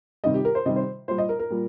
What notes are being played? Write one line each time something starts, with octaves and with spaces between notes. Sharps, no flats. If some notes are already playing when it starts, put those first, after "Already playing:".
C3 D#3 G3 D#5
G4
A#4
C5
C3 D#3 G3 D#5
C5
A#2 G3 C5
D#5
A#4
A#4
A#2 G3